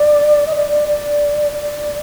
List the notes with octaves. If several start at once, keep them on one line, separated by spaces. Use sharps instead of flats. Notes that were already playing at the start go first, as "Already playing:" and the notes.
Already playing: D5
D#5
D5
D5
D5
D5